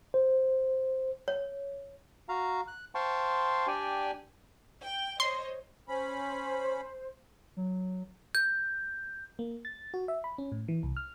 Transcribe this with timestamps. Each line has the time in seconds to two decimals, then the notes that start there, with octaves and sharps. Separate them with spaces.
0.14 C5
1.28 C#5
2.29 F#4 F5 A#5
2.68 F#6
2.95 C5 F5 G5 A5 C6 C#6
3.67 D4 G4 D5 G5 G#5
4.84 G5
5.20 C5 C#5 D#5 C6
5.88 C#4 C5 B5
7.57 F#3
8.35 G6
9.39 A#3
9.65 A6
9.94 F#4
10.08 E5
10.24 B5
10.38 C#4
10.52 A2
10.68 E3
10.83 C2
10.97 F6